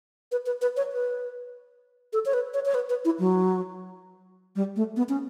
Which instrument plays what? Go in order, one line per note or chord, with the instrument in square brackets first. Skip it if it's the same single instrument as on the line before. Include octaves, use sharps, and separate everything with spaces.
[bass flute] B4
B4
B4
C#5
B4
A4
C#5
B4
C#5
C#5
B4
B4
E4
F#3
G3
A3
B3
C#4